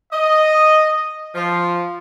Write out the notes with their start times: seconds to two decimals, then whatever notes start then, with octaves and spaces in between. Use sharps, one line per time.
0.12 D#5
1.35 F3